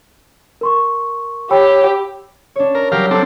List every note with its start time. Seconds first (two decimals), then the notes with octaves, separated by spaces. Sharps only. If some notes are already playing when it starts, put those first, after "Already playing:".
0.61 A#4 C6 C#6
1.51 G4 C#5 G5 B5 E6
2.56 D4 C#5
2.75 A#4
2.92 F#3 G3 G4 A#4 F5
3.11 C4 D4 A4